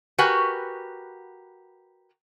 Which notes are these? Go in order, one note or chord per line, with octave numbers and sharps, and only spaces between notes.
F#4 G4 A#4 B4 F#5 G#5